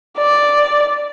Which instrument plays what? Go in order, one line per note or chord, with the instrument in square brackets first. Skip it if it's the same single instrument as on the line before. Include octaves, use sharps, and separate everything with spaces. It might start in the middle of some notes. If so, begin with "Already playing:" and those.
[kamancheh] D5